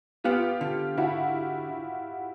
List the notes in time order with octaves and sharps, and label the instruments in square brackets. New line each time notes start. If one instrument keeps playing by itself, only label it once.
[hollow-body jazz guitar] B3 [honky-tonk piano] F4 G4
[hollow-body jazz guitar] D3
[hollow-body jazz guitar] D3 [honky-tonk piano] E4 F#4